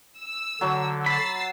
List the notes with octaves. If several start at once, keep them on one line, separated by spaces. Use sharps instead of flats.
E6
D3 F#3
B5 E6 A6 C7